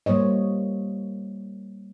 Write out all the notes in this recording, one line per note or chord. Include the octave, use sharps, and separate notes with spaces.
G3 A#3 C5 C#5 D#5